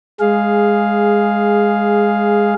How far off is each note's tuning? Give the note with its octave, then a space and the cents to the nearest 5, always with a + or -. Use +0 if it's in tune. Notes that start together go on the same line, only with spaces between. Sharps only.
G#3 -10 G#4 +0 F5 +0